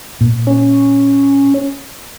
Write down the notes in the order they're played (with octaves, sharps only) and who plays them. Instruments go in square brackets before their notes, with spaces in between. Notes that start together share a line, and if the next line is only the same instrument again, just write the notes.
[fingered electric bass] A#2
[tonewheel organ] C#4